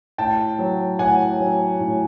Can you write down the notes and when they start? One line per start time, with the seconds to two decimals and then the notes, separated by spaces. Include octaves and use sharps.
0.18 A2 G5 A5
0.59 F#3
0.99 A2 F#5 G#5
1.40 F#3
1.80 A2